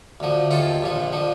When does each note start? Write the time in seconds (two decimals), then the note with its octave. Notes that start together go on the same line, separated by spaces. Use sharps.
0.20 D2 D3 F3
0.51 D#2 D#3 F4 A4
0.82 A#1 A#2 F3
1.13 D3 F3